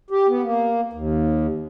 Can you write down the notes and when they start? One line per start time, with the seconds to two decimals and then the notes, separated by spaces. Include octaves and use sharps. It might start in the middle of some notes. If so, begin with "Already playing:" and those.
0.11 G4
0.29 B3
0.43 A#3
0.93 D#2